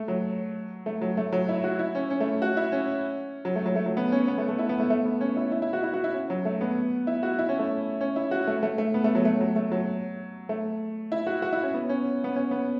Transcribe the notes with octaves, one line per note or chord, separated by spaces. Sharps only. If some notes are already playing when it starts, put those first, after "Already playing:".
Already playing: A3
F#3
A3
F#3
A3
F#3
E4
F#4
E4
C#4
C#4
A3
F#4
E4
C#4
F#3
A3
F#3
A3
F#3
B3
C#4
B3
A3
A3
E4
B3
A3
A3
B3
C#4
E4
E4
E4
F#4
E4
F#4
E4
C#4
F#3
A3
B3
E4
F#4
E4
C#4
A3
C#4
E4
F#4
A3
A3
A3
B3
A3
F#3
A3
F#3
A3
F#3
A3
E4
F#4
F#4
E4
C#4
B3
C#4
B3
C#4
B3